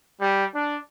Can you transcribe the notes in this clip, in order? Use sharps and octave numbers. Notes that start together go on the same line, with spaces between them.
G3
D4